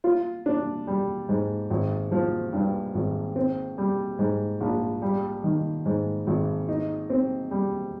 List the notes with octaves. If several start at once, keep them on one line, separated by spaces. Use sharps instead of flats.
F4
D4
G3
G#2
G#1
F3
G2
G#1
C4
G3
G#2
A#1
G3
D#3
G#2
G#1
D#4
C4
G3